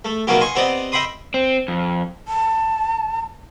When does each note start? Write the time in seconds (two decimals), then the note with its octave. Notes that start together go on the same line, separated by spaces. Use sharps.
0.05 A3
0.27 B2 D#3 F#3 A#3 B3 G4
0.41 D#4 G#5 C6 C#6
0.55 B3 C4 G4 D5 D#5
0.92 D#5 E5 G5 B5 C6 D#6
1.34 C4
1.68 F2
2.28 A5